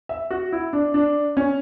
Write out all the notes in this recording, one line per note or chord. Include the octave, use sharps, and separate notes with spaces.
E5
F#4
E4
D4
D4
C#4